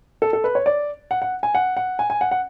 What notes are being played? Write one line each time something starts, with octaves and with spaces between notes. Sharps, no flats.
A4
A4
B4
C#5
D5
F#5
F#5
G#5
F#5
F#5
G#5
G#5
F#5
F#5